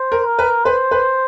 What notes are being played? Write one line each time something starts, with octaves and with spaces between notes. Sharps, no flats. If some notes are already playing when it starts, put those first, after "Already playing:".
Already playing: C5
A#4
A#4
B4
B4 C5
B4